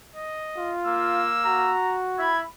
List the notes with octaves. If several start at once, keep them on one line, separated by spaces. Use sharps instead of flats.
D#5
F4
A#3 E6
F#4 A#5
E4 B5 G#6